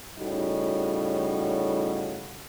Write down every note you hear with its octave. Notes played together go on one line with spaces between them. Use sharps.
A2 C#3 G3 D#4 F#4